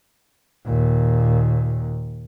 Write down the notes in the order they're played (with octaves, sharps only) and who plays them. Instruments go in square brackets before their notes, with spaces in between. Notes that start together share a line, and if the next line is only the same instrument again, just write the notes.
[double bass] D#2 A#2